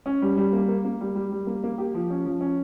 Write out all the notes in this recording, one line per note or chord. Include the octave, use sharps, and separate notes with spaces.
C#4
G3
G3
A#3
A#3
A#3
G3
G3
G3
A#3
A#3
G4
F3
C#4
F3
C#4